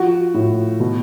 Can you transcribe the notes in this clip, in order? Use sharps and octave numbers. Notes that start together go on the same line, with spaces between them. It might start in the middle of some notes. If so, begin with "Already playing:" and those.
Already playing: F3 F#4
A2
B2